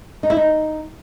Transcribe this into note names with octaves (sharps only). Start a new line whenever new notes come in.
D#4
E4
D#4